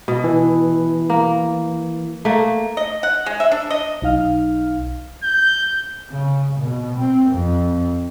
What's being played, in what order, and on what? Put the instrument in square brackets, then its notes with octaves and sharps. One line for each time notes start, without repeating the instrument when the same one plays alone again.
[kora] B2
[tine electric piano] E3
[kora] A#3
A3 A#3
[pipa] D#5
F#5
G#3
E5
D4
D#5
[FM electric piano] B1 D#4 F5 F6
[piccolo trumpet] G6
[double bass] C#3
B2
C4
F2